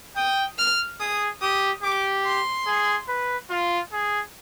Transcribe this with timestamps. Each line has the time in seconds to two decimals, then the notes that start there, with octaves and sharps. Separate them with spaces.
0.16 G5 D#6
0.59 F6
1.00 G#4 D#6
1.42 G4 D#6
1.83 G4 D6
2.26 C6
2.67 G#4
3.08 B4
3.50 F4
3.92 G#4